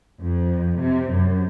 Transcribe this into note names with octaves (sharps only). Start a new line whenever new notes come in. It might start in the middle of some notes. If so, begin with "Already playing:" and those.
F2
C3
F#2